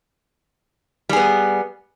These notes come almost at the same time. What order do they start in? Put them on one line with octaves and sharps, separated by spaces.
G3 G#4 B3